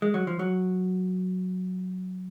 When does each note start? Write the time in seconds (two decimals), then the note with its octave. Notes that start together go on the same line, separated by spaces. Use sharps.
0.02 G#3
0.14 F#3
0.27 F3
0.39 F#3